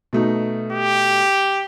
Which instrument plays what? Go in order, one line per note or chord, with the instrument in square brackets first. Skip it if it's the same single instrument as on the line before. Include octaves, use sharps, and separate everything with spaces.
[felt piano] B2 A3 D#4
[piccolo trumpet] G4